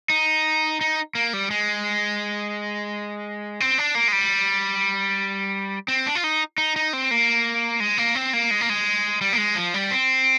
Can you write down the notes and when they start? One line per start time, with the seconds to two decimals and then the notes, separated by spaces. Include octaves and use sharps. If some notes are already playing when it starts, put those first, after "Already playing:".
0.10 D#4
0.81 D#4
1.15 A#3
1.33 G3
1.51 G#3
3.60 C4
3.78 D4
3.95 A#3
4.08 G#3
4.12 G3
5.88 C4
6.06 D4
6.15 F4
6.24 D#4
6.58 D#4
6.76 D#4
6.93 C4
7.11 A#3
7.80 G#3
7.98 A#3
8.15 C4
8.33 A#3
8.51 G#3
8.61 A#3
8.69 G#3
9.21 G3
9.33 A#3
9.38 G#3
9.56 F3
9.74 G3
9.91 C4